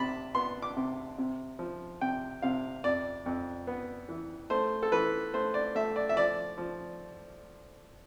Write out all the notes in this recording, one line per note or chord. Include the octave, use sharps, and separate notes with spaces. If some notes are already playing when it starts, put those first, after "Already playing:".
Already playing: C3 A5 B5
B3 C6
D6
C3
C3
F3
C3 G5
C3 F5
F2 D5
F2
B3
E3
A3 C5
A4
E3 B4
A3 C5
D5
A3 E5
D5
E5
F3 D5
F3